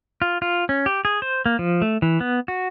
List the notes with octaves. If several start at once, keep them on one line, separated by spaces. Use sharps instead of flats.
F4
F4
C#4
G4
G#4
C5
A#3
F3
A3
E3
B3
F#4